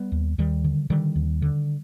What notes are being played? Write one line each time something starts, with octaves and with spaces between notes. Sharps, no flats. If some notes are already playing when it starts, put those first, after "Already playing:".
Already playing: G3 B3
D#2
D#2 D#3 G3
D3
D3 D#3 G3
D#2
D3